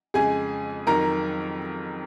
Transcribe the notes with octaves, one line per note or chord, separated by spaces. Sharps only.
F2 C#3 G#3 G#4 G#5
F2 D#3 F#3 A#4 A#5